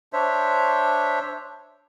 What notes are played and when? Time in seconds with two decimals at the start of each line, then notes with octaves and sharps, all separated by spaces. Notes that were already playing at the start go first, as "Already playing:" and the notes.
0.13 D4 C5 C#5 E5